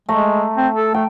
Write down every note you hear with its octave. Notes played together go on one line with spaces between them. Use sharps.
G#3 A3 A#5
C4
A4
A3 G5